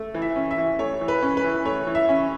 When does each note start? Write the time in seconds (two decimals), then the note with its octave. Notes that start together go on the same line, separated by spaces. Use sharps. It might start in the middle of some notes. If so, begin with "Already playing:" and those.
Already playing: A3
0.14 E3
0.22 E5
0.36 C#4
0.51 E5
0.58 E3
0.79 A3 C#5
1.01 E3
1.08 B4
1.22 C#4
1.37 B4
1.44 E3
1.65 A3 C#5
1.87 E3
1.95 E5
2.09 C#4